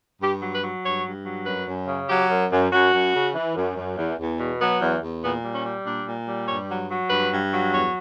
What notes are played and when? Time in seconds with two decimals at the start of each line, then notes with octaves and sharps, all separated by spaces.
0.21 G2 G4
0.41 F#3
0.52 B4
0.62 F#3
0.83 G2 C#5
1.04 G2
1.25 F#3
1.46 F#2 B4
1.66 F#2
1.88 C#3
2.09 F#3 G4
2.30 F#2
2.51 F#2
2.71 F#2 F#4
2.92 F#2
3.14 C#3
3.35 E3
3.55 F#2
3.76 F#2
3.96 E2
4.18 E2
4.39 B2
4.59 F#3 B3
4.80 E2
5.01 E2
5.22 A#2 B3
5.43 G3
5.53 C#4
5.63 G3
5.85 A#2 D4
6.05 A#2
6.27 G3
6.48 G2 C#5
6.69 F#3
6.89 F#3
7.09 G2 B4
7.31 G2
7.52 F#3
7.72 E2 C#5